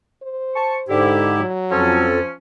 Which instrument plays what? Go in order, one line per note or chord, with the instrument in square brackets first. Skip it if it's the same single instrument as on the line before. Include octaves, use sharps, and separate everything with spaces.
[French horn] C5
[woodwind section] A5 C#6
[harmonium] G#2 G4 [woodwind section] D3 E4
[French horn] F#3
[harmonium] F2 A4 [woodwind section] F3 C#4